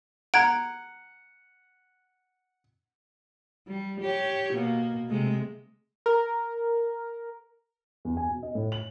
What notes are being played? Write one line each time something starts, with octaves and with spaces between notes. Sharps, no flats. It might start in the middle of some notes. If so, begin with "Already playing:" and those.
F#5 A#5 G#6 D7
G3
G4 C#5
B2 A#3
C3 G#3 A3
A#4
E2
G#5
B2
D#5
A2
F#7